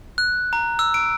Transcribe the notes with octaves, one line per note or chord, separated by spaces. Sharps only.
F#6
A#5
E6
D7